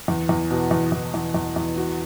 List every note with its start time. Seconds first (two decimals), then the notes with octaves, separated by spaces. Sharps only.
0.08 E2
0.29 E2
0.51 B2
0.71 E2
0.92 E2
1.14 E2
1.34 E2
1.56 E2
1.77 F#4